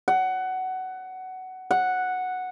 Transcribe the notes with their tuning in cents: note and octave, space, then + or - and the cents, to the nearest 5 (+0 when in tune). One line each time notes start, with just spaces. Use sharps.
F#5 +15
F#5 -5